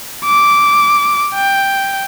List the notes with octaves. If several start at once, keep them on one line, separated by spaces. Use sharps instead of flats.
D6
G5